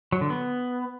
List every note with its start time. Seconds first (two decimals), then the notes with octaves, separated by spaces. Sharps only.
0.12 F#3
0.21 D3
0.30 B3